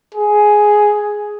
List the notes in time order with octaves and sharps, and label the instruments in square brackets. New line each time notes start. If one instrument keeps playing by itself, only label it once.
[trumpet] G#4